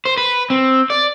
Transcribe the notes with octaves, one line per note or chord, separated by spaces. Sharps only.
C5
B4
C4
D5